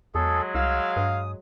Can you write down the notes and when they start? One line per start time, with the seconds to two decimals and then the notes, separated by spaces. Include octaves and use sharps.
0.15 E2 F#3 G#3 G#4 A4
0.55 C2 F5 E6
0.96 G2 D#6